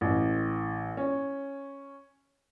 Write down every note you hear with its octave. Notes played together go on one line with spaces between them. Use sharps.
A1
C#4